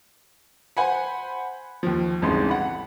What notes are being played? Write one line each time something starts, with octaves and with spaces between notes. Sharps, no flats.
C5 F#5 G#5 B5
D#2 F3
D#1 G#1 G#2 C#3 E3 C6
F#5 B5